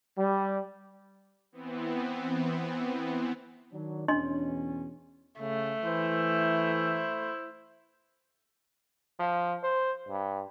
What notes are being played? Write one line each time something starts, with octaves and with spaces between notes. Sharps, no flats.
G3
E3 B3 C4
D#3 F#3 D4
E2 B2 C#4 D4 D#5 C6
C#3 A3
E3 E4 C5
F3
C5
G2